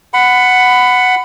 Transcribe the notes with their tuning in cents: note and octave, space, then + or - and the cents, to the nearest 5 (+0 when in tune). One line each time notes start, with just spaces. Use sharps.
F#5 +0 B5 +20